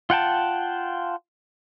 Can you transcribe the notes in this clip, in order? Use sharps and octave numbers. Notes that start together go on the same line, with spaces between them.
F4 F#5 G5 A5